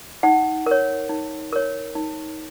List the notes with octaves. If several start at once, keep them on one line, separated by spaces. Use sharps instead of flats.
D#4 F#5
A#4 C#5
D#4
A#4 C#5
D#4